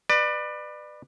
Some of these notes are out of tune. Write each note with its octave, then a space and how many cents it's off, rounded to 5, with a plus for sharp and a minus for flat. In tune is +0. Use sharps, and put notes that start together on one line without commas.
B4 +0 D5 +30